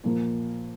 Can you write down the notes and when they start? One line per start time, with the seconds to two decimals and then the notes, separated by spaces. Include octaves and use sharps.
0.04 A#2 F3 A#3